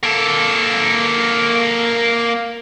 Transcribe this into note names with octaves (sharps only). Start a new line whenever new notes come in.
A#3 A4